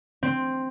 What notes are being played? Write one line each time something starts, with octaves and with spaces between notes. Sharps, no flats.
C4